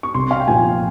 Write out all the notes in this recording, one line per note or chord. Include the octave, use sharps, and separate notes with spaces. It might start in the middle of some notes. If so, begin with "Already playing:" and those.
C#6
C2 C6
F5
G5
A#2 F3 G#5